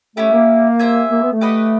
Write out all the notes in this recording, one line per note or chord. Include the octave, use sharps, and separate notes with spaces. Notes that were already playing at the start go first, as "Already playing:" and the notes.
A3 C#4 E4 G4
A#3
G4 C5 E5 G#5
A#3
B3
A3
G4 B4 D#5 F#5